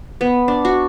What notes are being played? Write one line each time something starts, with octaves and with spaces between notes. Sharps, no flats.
B3
D4
F#4